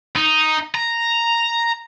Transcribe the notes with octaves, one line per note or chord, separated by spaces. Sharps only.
D#4
A#5